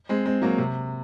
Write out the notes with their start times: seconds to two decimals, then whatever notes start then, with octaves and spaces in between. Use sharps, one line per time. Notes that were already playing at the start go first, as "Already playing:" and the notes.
0.09 G#3 C4
0.25 G#3 C4
0.42 F#3 A#3
0.58 C3